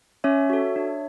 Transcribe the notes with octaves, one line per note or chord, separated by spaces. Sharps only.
C#4 C#5 E5
F#4 A4
D4